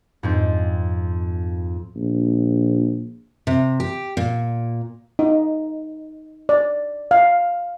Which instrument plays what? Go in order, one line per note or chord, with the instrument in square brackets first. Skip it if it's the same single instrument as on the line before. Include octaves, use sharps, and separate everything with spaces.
[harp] F2 G#2 C4
[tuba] A#1
[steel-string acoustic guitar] C3
G4
A#2
[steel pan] D#4
D5
F5